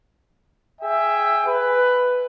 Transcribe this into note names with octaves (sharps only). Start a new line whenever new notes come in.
G#4 E5 G5
B4